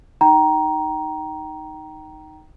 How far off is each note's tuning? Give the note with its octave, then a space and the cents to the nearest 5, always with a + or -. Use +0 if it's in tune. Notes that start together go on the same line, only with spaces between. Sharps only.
D#4 +0 G5 -20 A#5 +10